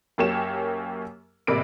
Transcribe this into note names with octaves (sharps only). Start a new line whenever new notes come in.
F#2 F#3 A#3 G4 C#5 E7
A1 C3 A#3 D5 B5 D7